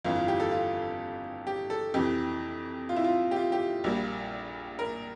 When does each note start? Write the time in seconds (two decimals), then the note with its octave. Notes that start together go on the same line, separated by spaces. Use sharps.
0.04 G1 F2 E3 F4
0.16 F4
0.28 G4
0.40 A4
0.51 F4
1.47 G4
1.70 A4
1.94 F2 C3 E3 G4
2.89 F4
2.96 E4
3.04 F4
3.31 G4
3.36 F4
3.52 G4
3.84 A#1 A#2 G3 A#3
4.79 A#4